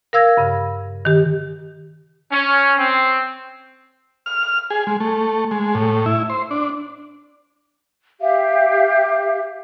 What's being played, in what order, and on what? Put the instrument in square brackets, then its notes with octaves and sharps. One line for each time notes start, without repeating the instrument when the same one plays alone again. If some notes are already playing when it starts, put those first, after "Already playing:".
[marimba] A#4 F5 E6 G#6 A#6
G2 C#3
D#3 G4
[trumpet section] C#4
C4
[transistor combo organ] F6
G#4
G#3
A3
G#3
A2
E4
C5
D4
[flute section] G4 E5 F5